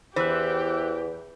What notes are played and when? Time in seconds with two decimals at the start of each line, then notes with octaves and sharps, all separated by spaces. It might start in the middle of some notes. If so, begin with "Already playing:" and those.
0.16 E2 E3 G4 C5 E6 F#6